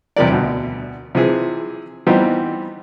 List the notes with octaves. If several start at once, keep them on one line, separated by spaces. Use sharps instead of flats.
E2 C3 F3 G3 A#4 D5
D2 B2
C3 E3 F3 F4 G#4 B4
E3 G3 B3 C4 D#4 F4